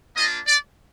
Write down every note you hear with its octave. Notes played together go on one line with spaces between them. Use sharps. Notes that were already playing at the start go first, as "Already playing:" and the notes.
A#3 D4 F4 D#5
D5